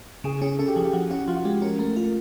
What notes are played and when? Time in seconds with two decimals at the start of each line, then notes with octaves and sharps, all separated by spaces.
0.24 C#3 G#4
0.42 C#4 G#4
0.59 C#4 A4
0.68 G4
0.76 F3 G#4
0.85 G4
0.93 F3 F#4
1.11 C#4 F#4
1.27 F3 F4
1.37 F#4
1.44 G#3 G4
1.62 C#4 A#4
1.79 A3 A#4
1.96 F4 A#4